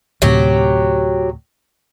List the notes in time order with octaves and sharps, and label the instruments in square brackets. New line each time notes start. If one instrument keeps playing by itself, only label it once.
[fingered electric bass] D2 A2 C3 [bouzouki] F#3 G4